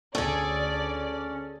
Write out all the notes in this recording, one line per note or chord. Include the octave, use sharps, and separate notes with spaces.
D2 C#4 G#4 A4 D5